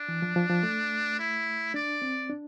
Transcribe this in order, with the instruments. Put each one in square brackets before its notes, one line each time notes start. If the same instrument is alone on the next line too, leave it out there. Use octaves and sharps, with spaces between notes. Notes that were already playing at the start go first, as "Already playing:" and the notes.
Already playing: [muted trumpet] D4
[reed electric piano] E3
F3
F3
F3
A3
[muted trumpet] E4
[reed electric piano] D4 [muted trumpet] D5
[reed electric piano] C4
D4